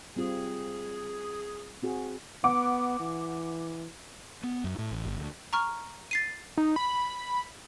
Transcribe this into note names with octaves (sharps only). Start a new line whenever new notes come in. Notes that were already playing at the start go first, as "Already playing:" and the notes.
G3 C4 F4 G#4
C4 F#4 G#4
B3 F#5 D6
E3
B3
F#2
A2
A1
G1
D2
A#5 C#6 F6
A6 C7 D#7
D#4
B5